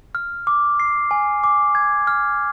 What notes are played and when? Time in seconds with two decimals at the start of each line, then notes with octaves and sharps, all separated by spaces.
0.15 F6
0.47 D6
0.80 C7
1.11 G#5
1.44 D6
1.75 G#6
2.07 F6